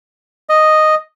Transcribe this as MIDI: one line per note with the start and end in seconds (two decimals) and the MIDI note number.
0.49 0.95 75